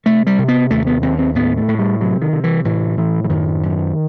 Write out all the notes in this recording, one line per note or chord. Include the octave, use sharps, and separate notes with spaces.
C3 A3
G3
C3
B3
D#2 A3
B3
D#2 C4
C4
A2 B3
A3
A2
G3
C3 F#3
D#3
C3
E3
A2 E3
A2 E3
E3
F#2 D#3
F#2